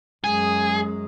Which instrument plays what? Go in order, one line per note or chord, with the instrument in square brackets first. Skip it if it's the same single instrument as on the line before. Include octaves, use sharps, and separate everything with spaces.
[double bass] F#2 G#3 [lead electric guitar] G#4